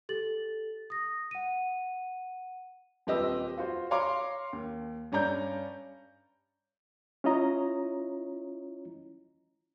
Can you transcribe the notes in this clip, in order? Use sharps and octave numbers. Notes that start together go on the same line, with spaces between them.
G4 A4 A6 F#7
D#6 A#6
F#5 D#7
D#1 C4 G4 B4 D#5 E6
F4 F#4 C5
C#5 F5 A#5 C6 D6
D#2
G2 C#4 D5 A#5 G6
C#4 E4 F4 C#5 D#5 A#5